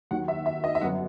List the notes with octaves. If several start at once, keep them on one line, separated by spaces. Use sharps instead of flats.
D#2 D#3 F#3 F#5
E5
E5
D#5
E5
G1 F#2 F#3 B3 F#5